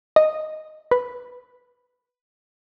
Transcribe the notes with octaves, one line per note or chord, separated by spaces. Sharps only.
D#5
B4